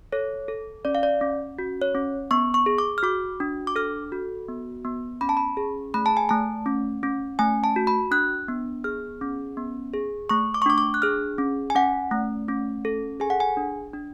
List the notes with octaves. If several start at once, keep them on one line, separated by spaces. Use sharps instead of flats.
A4 C#5
A4
C#4 D5
F5
D5
C#4
F#4
C#5
C#4
B3 C#6
C#6
G#4
D6
F6
F#4 D6
D4
D6
A4 F6
F#4
B3
B3
C#4 B5
A5
B5
G#4
A3 B5
A5
G#5
A3 A5
C#4
C#4
A3 G#5
A5
F#4
B5
D4 F#6
B3
G#4 F6
C#4
B3
G#4
A3 C#6
D6
C#6
D4 D6
D6
F#6
G#4 F6
C#4
G#5
C#4 F#5
A3
C#4
A4
G#4 G#5
F#5
G#5
D4
D4